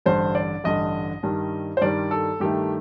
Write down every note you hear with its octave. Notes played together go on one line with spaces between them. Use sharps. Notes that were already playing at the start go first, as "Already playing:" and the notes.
A1 G2 D3 C5
D5
A1 G2 D3 D#5
G2 D#3 G3
C5
G2 D#3 G3 D5
A4
G2 D#3 A3 G4